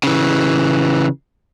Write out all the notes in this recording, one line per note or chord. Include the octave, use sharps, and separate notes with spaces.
C#3 E3